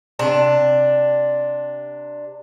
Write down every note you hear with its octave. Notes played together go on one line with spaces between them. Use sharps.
C3 D4 A5